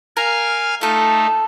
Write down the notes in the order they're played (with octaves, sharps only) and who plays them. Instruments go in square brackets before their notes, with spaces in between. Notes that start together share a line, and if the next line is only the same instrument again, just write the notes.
[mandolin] A#4 [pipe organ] F5 G#5 F6
[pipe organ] A3 D#4 [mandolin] F4 A4